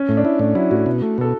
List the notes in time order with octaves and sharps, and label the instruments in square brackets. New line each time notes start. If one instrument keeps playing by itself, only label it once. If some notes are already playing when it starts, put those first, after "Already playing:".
Already playing: [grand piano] C#4
[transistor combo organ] A2
[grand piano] D4
[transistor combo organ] E4
[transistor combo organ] A2 [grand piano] D4
[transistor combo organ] F#3 [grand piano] E4
[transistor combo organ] A2 [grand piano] F#4
[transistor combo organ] B2
A3
[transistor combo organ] B2 [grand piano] A4